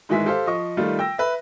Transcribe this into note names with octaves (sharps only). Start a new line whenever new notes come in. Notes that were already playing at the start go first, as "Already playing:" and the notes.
G#2 D#3 E3 G#3 E5 B6
G4 A4 C5 F5
F3 D#5 C#6
D#3 G3 A3 F4
G5 E6 A#6
B4 E5